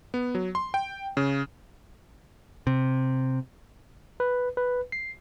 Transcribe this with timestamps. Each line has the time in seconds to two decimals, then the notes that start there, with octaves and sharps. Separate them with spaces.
0.14 B3
0.35 F#3
0.55 C6
0.74 G5
1.17 C#3
2.67 C3
4.20 B4
4.57 B4
4.92 C7